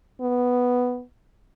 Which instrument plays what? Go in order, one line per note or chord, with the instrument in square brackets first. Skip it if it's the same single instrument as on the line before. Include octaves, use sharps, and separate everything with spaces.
[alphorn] B3